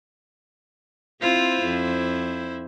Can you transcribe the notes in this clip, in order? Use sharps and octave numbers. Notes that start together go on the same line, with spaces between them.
C4 E4 F4 C5
F2